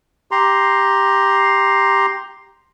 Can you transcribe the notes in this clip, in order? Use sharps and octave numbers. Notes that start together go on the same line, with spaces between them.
G4 A#5 C6